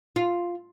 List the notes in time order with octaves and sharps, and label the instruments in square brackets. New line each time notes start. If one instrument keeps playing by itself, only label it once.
[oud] F4